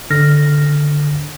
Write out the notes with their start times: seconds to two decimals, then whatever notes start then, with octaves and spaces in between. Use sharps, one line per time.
0.10 D3 F6 A#6